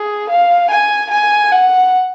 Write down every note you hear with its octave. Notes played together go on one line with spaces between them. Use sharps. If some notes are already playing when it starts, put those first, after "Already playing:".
Already playing: G#4
F5
G#5
G#5
F#5